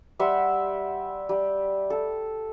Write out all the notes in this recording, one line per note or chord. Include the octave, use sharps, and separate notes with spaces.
G3 E5 F#5 C6
G3
A4